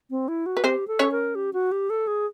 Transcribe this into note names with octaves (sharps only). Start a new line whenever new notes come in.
C4
E4
F#4
B4
C4 G4 C5
A4
C#4 C#5
A#4
G4
F#4
G4
A4
G#4